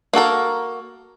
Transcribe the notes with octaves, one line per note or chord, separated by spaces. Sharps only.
A#3 F#4 A4 A#4